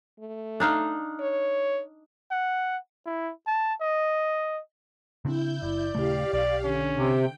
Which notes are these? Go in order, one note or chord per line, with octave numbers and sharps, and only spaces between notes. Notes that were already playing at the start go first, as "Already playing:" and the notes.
A3
D4 D#4 F5
C#5
F#5
E4
A5
D#5
C#3 C4 D4 E4 G6
F#1 D5
D#1 C#3 A3 G4 F5
B1 D5
D3 C#4
C3 G5